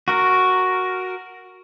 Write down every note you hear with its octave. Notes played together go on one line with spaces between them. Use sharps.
F#4 A#4